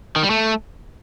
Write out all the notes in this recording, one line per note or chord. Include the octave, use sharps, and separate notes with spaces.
D#3
G3
A3